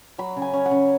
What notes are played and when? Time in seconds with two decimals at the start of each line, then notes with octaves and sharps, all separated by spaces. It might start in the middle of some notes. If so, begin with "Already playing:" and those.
0.18 F#3 B5
0.36 C#3
0.42 G#5
0.53 C#4
0.65 F#5
0.71 C#3